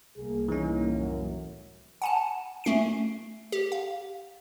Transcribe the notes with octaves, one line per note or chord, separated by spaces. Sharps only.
C2 A2 A#3 G#4
E3 C#4 D#4
F#2
F#5 G#5 A5
A3 C#4 C7 D7
G4
F5